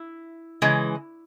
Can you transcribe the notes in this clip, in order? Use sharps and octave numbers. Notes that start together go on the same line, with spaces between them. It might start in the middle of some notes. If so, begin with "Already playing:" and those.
Already playing: E4
C#3 E3 G#3